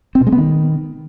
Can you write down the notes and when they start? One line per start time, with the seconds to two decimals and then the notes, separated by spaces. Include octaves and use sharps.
0.15 C4
0.21 B2
0.27 G#3
0.32 B3
0.38 D#3